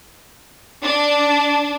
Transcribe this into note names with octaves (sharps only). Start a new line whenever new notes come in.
D4